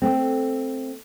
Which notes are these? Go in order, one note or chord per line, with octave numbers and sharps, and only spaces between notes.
A3 C4